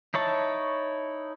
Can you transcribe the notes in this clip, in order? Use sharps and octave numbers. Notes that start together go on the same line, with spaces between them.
D#4 E4 C#5 A5